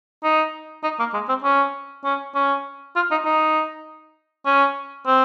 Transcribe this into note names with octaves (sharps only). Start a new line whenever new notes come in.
D#4
D#4
A#3
G#3
C4
C#4
C#4
C#4
F4
D#4
D#4
C#4
C4